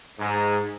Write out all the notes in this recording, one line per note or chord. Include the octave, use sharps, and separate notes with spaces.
G#2